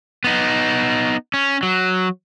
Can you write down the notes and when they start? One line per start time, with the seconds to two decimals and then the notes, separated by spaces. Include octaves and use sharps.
0.24 B3 D#4
1.34 C#4
1.63 F#3